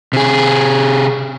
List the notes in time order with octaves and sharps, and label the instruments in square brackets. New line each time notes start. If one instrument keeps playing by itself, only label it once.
[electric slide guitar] C3 G#4